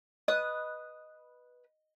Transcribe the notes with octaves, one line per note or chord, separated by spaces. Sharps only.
B4 D#5 D#6 F#6